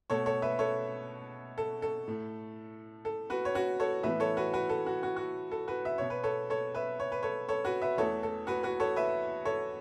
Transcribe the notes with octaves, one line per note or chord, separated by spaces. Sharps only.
B2 A3 A4 C#5
A4 C#5
B4 E5
A4 C#5
A4
A4
A2 A3
A4
F#4 B4
C#5
F#4 B4
A4 C#5
A2 E3 B3 B4 E5
A4 C#5
F#4 B4
F#4 B4
A4
F#4
F#4
F#4
A4
F#4 B4
E5
B2 B3 C#5
B4
A4 C#5
A4 C#5
B4 E5
C#5
B4
A4 C#5
A4 C#5
F#4 B4
B4 E5
E2 E3 A3 A4 C#5
A4
F#4 B4
F#4 B4
A4 C#5
B4 E5
A4 C#5